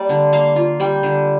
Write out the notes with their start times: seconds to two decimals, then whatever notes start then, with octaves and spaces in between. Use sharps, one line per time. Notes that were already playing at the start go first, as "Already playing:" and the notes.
Already playing: G3 A#3 D5
0.09 D3
0.33 A#3 F5
0.56 F4
0.80 G3 G5
1.03 D3